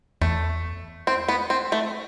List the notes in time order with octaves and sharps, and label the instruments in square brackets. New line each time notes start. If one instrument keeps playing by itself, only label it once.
[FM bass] E2 [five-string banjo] A3
[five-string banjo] C4
B3
C4
A3